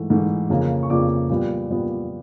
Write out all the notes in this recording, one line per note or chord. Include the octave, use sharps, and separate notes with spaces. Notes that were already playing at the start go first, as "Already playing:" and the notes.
Already playing: G#2 E3 A3
G#2 E3 A3
F2 C#3 F3 A#3
C#6
F2 C#3 F3 A#3 D5 D6
A#2 G3 B3
A#2 G3 B3